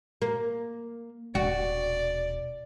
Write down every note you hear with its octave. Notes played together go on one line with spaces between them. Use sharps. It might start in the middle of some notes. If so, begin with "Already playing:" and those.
A#3
D#1 B2 F#4 D5